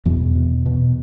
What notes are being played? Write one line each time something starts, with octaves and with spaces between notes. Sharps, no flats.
E2 B2 E3
B2
B2